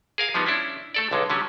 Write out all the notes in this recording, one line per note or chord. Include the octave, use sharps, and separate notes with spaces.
G#4 A#4 F5
F3 G3 B3 D#4
C#4 D4 E4
A3 A4 D5
B1 D3 G#3
D3 F#3 G3 C#4